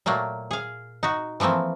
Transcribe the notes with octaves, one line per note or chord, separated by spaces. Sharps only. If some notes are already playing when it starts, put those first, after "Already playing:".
A#2 F#3 A3 A#3
G#4 F5
D#4 F#4
E3 F3 A3 A#3 C4